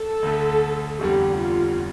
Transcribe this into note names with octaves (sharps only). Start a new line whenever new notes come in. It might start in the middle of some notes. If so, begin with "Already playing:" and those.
Already playing: A4
D2 D3 A3
F1 E2 D3 G3 G4
F4